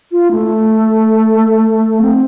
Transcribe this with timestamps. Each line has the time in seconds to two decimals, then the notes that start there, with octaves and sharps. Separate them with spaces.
0.12 F4
0.31 A3
2.01 C4